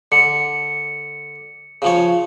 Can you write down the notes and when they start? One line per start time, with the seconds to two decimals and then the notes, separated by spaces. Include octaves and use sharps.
0.12 D3 C#7
1.82 C#3 F3 C#5